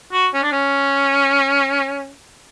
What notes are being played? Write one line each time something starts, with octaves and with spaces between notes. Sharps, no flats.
F#4
C#4
D4
C#4